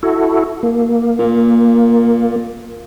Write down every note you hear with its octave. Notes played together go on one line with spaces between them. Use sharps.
E4 F#4 A4
A#3
A#2